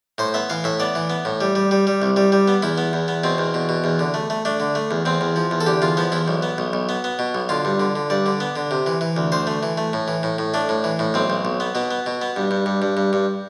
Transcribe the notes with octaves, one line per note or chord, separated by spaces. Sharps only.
A2 C5
B3 E5
E3 F5
A2 E5
B3 D5
E3
B3
A2
G3
G3
G3
G3
C2
G3
G3
B3
E2 E4
B3
E2
B3
B2 C4
E2
B2
B2
E2
D3
A3
A3
A3 D4
D3
A3
E2
E2 C4
E2
F3
E2
A4
D3 G4
E2 F4
F3 B3
E2 E4
B1
B3
B1
B1
B3
B3
B2
B1
D3 F4
G2
D3
D3
G2 D5
D3
B3
D3
C3
E3
E3
D2
D2 C5
A3
E3
A3
A2
E3
A2
A2
A3 D4
A2
E3
A2
B1 C4
B1
B1
B3
B2 B3
B3
B2
B3
G2
G2
G2
G2
G2
G2